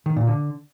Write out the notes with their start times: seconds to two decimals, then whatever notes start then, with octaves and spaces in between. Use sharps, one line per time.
0.06 D#3
0.17 A#2
0.27 D3